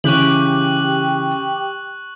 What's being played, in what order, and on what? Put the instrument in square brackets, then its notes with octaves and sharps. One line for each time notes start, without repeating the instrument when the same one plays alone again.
[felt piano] C#3 E3 [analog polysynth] G4 [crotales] C#6 F#6 F#7